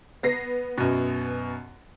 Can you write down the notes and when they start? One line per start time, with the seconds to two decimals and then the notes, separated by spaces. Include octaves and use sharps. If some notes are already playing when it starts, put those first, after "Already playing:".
0.23 B3 A#6 C7
0.78 F#2 B2